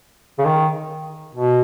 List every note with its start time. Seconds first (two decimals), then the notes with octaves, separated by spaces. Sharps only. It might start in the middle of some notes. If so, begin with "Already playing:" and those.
0.39 C#3
0.44 D#3
1.35 B2